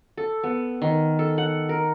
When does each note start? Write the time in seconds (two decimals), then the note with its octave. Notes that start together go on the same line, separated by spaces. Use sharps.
0.17 A4
0.44 B3
0.82 D#3
1.19 A4
1.38 F#5
1.69 A#4